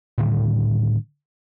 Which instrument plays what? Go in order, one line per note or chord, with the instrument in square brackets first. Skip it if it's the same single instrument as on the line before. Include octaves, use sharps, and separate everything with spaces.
[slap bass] A2 D3 D#3 G3